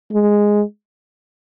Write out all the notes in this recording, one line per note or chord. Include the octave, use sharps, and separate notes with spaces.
G#3